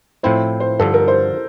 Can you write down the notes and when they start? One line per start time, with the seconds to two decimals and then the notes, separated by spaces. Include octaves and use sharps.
0.23 A2 F3 C4 E4 C5
0.60 C5
0.79 G2 D3 F3 A4
0.94 A#4
1.08 C5